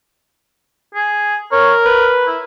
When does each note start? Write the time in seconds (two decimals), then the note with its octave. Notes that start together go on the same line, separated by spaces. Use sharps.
0.95 G#4
1.52 A#4 C#5
1.85 B4
2.27 E4